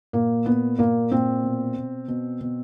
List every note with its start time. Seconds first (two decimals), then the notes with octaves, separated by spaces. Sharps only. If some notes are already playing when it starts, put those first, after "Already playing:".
0.13 A#2 A#3
0.46 A#2 B3
0.78 A#2 A#3
1.11 A#2 C4
1.43 B2
1.77 B2
2.08 B2
2.41 B2